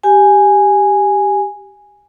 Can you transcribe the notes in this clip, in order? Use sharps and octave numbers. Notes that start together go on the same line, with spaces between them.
G4 G#5